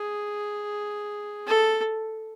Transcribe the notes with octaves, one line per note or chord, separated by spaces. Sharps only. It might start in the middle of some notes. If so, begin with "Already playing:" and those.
Already playing: G#4
A4